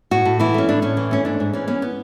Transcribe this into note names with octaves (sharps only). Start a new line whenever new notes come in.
A2 F#4
A2
E3 E4
A3 C#4
A2 D4
A2 C#4
E3
A3 C#4
G#2 D4
G#2
E3 C#4
B3 C#4
B3